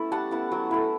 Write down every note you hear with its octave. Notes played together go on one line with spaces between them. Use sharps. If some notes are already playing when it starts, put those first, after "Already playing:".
Already playing: A3 B3 C#4 E4
G3 F#5 A5
B3 E4
F#3
A3 E4